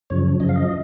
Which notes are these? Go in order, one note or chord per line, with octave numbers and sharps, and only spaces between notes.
F#2 C#3 F3 C#5
F#2 C#3 F3 D#5
F5
D#5